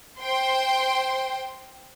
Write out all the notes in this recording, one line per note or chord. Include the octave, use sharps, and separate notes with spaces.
C5 G5 C6